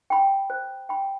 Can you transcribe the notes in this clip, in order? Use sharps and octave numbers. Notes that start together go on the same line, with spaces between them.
G5 B5
C5
G5 B5